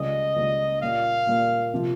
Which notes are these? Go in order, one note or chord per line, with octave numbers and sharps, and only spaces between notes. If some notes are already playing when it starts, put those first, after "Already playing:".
Already playing: C#2 C#3 G3 D#5
C#2 C#3 G3
A#2 G3 A#3 F5
A#2 G3 A#3
C3 F3